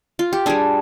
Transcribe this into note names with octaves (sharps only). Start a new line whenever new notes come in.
F4
G4
G3 D4 G#4